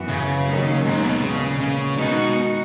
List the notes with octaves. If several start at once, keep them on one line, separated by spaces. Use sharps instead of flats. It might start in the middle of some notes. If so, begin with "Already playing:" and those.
Already playing: F#2 E3 B3 F#4
C#3
D#2 D#3 F#3
G#2
B2
A#2 C#3 G#3 B3
C#3
B2 D#3 G#3 D#4 F#4